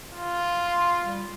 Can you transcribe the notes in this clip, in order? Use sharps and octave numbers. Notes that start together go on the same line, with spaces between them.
F4
C6
G3